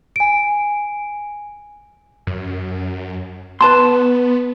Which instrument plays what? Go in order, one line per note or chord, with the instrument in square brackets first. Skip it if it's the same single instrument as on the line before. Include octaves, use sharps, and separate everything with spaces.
[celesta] G#5 D7
[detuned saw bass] F#2
[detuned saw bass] B3 [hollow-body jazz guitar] B4 A5 C6